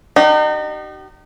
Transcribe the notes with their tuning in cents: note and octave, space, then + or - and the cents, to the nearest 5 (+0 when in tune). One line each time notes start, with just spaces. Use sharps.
D#4 -35 G4 -40